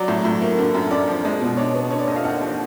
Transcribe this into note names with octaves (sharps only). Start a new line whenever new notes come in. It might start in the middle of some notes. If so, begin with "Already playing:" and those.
Already playing: F#3 D5
A2
A2
A#3
D3
F#2
F#2 D5
F3
G#3
B2
D4 C#5
B3
D3 C#5
D5
D#2 D#5
F5
D#2 F#5
F3